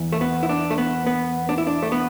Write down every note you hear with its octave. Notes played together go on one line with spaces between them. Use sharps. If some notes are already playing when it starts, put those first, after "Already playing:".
Already playing: E2 E3
A3
B3
E4
D4
A3
B3
B3
D4
E4
D4
A3
B3